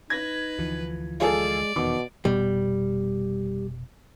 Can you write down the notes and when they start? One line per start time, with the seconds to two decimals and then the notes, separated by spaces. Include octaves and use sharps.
0.10 D#4 B4 G#6 A#6
0.59 D2 E3 F3
1.20 G#3 F4 G#4 A4 D5
1.76 D#1 E2 B2 D#3 D6
2.25 F1 B2 G3 B3